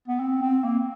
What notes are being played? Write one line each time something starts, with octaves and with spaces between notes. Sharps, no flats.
B3
C4
C4
A#3